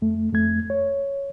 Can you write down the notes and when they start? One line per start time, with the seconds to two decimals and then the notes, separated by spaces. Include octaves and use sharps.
0.02 F2 A3
0.33 F2 A3 G#6
0.70 C#5